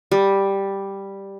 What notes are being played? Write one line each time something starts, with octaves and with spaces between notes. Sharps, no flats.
G3